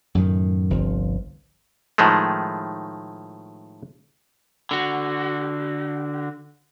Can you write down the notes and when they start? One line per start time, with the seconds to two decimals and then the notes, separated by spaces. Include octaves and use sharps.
0.15 F#2 A2 C3 D#3
0.70 G1 C2 C3 F3
1.98 A2 D#3 F3 G#3 A3
4.71 D3 F#4